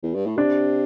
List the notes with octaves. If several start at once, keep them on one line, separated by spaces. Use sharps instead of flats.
E2
G2
A2
C3 D4